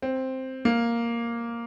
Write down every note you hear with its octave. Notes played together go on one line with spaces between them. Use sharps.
C4
A#3